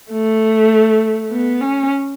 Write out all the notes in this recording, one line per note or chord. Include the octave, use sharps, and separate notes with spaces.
A3
B3
C#4